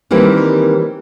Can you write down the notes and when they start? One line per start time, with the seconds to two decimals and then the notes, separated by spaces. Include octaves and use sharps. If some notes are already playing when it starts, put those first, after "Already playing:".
0.11 D#3 E3 G3 A#3 C4